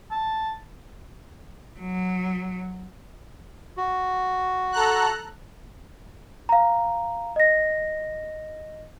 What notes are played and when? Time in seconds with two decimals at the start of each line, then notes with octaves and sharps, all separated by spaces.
0.11 A5
1.80 F#3
3.77 F#4
4.72 A4 A#5 F#6
6.49 F5 A#5
7.36 D#5 A#6